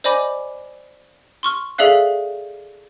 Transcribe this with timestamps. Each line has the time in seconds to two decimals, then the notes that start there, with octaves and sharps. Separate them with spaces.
0.04 C5 D5 D#5 G#5 B5 D6
1.43 C6 C#6 F6
1.78 G#4 A4 D5 E5 F5 F#6